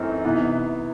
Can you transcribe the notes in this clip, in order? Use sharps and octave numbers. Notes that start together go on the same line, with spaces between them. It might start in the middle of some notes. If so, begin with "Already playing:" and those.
Already playing: F#2 E3 A3 C4 D#4
C3 E3 B3 D#4